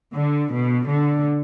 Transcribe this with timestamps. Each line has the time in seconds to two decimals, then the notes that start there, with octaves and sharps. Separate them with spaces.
0.15 D3
0.52 B2
0.90 D3